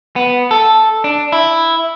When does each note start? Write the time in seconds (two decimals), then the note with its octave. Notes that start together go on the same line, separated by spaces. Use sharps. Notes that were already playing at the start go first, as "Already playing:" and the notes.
0.16 B3
0.51 A4
1.04 D4
1.32 E4